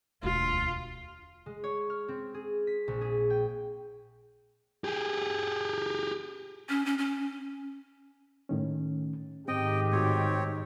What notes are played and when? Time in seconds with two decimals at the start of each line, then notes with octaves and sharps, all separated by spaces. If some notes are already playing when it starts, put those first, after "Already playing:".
0.23 E1 D2 F4
1.46 G#3
1.64 C#5
1.90 F6
2.08 C4
2.34 G#4
2.67 B6
2.88 A#1
3.01 G#4
3.30 G5
4.84 G4 G#4
6.69 C#4
6.86 C#4
6.98 C#4
8.49 A2 D#3 C#4
9.48 G#2 D#3 C4 G4 D#5 G5
9.92 A2 C4 F#4 C#5